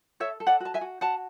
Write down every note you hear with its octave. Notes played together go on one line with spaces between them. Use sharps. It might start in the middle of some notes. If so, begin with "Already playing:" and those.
A4 C#5 E5
A4
D5 F#5
F#4 A5
E5 G#5
F#4
F#4 F#5 A5